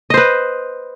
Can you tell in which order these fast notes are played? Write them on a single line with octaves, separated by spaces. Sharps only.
D#5 C5 B4